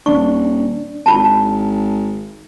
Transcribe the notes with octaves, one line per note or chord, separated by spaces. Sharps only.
D#1 D4 C#6
G#1 F4 A5